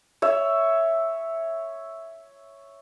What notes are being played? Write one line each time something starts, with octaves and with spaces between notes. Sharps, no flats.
C#5 E5